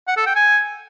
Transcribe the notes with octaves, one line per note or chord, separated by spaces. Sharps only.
F#5
A4
G5
G#5